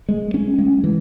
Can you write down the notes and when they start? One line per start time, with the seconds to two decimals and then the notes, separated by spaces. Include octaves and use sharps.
0.09 G#3
0.34 C#4
0.59 G#3
0.84 E3